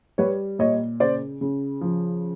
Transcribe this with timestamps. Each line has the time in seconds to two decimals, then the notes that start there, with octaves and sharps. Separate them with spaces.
0.18 G3 B4 C#5
0.59 A#2 C#5 D#5
1.00 C#3 C5 D5
1.41 C#3
1.81 F3